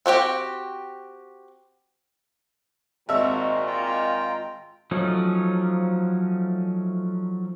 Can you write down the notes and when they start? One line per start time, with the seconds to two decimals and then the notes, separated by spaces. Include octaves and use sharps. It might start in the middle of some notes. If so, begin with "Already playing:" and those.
0.06 C4 F#4 G4 G5
3.09 G#1 A#2 D#3 F#4 C5 E5
3.67 F4 G5 A#5
4.91 F3 F#3 A3 C#4 D#4